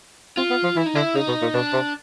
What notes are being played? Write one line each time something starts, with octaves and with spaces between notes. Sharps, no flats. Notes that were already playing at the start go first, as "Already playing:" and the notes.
C4 F4
B3
F3
E3 E4
D#4
D3 E4
C#3 D#4
B2
A#2
B2 D4
C3